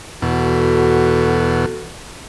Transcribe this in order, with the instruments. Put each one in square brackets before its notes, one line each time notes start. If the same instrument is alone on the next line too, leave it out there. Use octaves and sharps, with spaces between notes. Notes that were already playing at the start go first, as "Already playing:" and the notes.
[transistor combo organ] E2 B2 [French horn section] F#4 A4